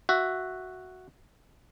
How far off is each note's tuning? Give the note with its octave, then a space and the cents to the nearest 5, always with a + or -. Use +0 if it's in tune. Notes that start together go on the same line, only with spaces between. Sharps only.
F#4 +0 E5 +5